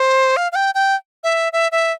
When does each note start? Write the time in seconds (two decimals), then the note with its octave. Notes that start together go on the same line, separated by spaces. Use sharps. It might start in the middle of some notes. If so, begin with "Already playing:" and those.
Already playing: C5
0.37 F5
0.52 F5
0.55 G5
0.75 G5
1.24 E5
1.53 E5
1.72 E5